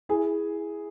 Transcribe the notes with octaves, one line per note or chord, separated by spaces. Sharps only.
E4 G#4